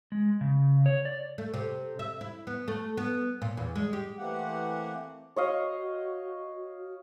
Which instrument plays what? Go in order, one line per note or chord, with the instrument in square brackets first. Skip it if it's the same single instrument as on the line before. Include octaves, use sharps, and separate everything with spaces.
[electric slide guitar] G#3
C#3
C#5
D5
[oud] A3
C3
E5
E4
B3
A3
B3
A#2
E2
G#3
G4
[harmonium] E3 A3 A#3 C4 G4 F#5
[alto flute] F#4 [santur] C#5 D#5 F5